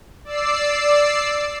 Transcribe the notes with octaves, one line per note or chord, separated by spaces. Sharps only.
D5 E6 C7